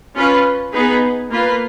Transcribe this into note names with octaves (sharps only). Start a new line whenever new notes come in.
C#4 F4 B4
B3 D#4 G#4 B4
A#3 F4 B4